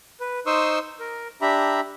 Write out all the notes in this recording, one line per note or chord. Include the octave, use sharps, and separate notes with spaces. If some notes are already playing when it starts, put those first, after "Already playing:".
B4
D#4 C5 C6 C#6 D#6 E6
A#4
D4 G4 E5 A#5 B5